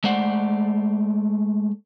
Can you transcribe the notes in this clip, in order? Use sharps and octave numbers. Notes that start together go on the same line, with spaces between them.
G#3 A3 C5 D5 F#5